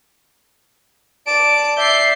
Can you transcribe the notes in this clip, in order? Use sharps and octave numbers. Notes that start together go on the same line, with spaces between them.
D5 A5 D7
D5 E5 G6 C7